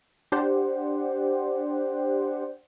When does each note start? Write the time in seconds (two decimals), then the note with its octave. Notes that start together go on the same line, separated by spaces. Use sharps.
0.32 D4 G4 C5 D5 F#5